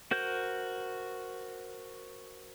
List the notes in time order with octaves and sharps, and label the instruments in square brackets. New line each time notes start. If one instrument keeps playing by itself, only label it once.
[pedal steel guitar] F#4 A#4 C5 G6